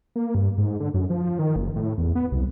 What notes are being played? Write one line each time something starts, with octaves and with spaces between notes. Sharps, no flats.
A#3
G2
G#2
D3
F#2
F3
D#3
F#1
A2
E2
B3
C2